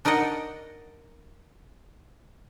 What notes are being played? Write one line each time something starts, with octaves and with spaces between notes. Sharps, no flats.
D4 D#4 A#4 D5 D#5 F#5